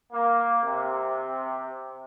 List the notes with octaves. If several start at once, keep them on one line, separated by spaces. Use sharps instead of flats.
A#3
C3